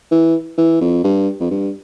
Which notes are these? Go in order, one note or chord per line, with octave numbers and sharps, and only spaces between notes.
E3
E3
F2
G2
F2
G2